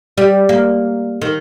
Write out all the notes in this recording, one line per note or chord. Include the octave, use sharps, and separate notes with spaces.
G3
A#3
D#3